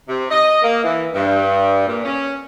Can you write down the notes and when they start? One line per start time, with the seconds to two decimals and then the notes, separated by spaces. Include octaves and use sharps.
0.08 C3
0.30 D#5
0.62 A#3
0.83 E3
1.13 G2
1.87 A#2
2.04 C#4